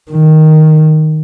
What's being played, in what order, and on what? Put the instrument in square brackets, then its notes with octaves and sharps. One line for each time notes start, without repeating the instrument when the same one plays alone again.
[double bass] D#3